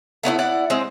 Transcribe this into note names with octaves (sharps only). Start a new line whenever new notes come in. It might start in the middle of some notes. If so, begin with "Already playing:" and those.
A3 B3 C#4 E4
E4 D5 F#5
G#3 C4